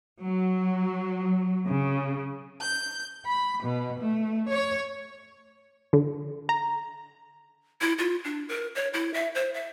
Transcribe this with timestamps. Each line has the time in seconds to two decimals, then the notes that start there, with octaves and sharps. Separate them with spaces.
0.22 F#3
1.68 C#3
2.61 G6
3.25 B5
3.62 B2
3.99 A3
4.48 C#5
5.93 D3
6.49 A#5
7.81 E4
7.98 F4
8.24 D4
8.49 A#4
8.75 C#5
8.94 E4
9.14 E5
9.35 C5
9.54 E5